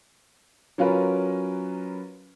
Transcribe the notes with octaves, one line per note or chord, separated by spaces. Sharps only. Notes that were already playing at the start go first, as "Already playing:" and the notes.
F#3 C#4 F4 A#4 B4